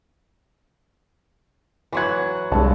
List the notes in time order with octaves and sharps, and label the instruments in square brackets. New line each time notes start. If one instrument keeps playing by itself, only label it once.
[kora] E3 F#3 F#5 [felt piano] C6 G#6
[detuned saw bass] C2 [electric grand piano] G2 A5 [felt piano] G#3